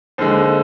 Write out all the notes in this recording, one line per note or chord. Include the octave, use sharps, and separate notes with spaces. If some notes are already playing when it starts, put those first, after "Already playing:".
D#2 D3 G#3 C5